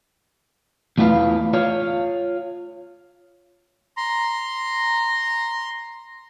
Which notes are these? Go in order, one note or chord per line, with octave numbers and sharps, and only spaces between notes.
E2 A3 E4 F4 B4 F5
F4 C#5 F5
A#5 C6